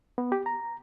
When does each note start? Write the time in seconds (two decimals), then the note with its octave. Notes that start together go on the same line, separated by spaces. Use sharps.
0.18 B3
0.32 G4
0.46 A#5